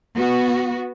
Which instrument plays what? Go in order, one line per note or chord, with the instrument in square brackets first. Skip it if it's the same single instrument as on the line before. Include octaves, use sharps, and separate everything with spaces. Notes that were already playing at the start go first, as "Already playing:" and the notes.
[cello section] B3 F#4